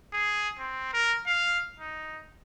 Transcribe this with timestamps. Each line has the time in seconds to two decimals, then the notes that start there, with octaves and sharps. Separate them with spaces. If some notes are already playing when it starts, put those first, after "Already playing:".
0.13 G#4
0.59 C4
0.93 A#4
1.26 F5
1.80 D#4